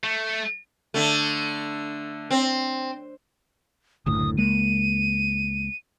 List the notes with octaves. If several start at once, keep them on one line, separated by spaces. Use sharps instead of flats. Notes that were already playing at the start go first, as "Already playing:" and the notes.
A3
D3 A3
C4
F#1 D2 A2 D#6
C#2 G#3 A#3 D#7